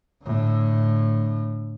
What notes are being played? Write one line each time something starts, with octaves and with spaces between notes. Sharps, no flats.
A2 D3